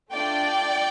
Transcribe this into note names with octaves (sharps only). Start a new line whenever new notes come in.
A3 D4 F4 D5 G5